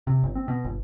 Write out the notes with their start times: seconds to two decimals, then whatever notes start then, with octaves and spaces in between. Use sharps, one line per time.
0.07 C3
0.23 G1
0.35 C4
0.48 B2
0.65 G1